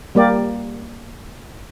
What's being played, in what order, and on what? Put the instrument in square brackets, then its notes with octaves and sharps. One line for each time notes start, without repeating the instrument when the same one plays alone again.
[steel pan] G3 A#3 G4 D5